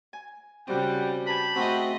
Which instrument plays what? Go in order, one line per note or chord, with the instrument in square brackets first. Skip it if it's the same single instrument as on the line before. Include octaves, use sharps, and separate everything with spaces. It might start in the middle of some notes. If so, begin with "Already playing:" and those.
[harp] G#5
[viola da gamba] C#3 G3 [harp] C4 F#4 [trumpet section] F#5 G5
[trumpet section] G4 A5 B5 [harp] B4 G#5
[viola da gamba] A3 G#4 D#5 [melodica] C4 F#4